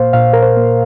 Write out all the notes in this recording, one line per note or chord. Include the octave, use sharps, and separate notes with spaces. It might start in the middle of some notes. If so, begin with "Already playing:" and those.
Already playing: A#2 A#3 C5 F5
A#2 F5
A#4
C5
A#3